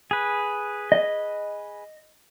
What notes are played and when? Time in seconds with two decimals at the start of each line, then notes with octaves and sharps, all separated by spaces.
0.11 G#4 B4
0.92 D#5